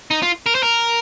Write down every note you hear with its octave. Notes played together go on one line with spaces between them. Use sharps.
D#4
F4
A#4
C5
A#4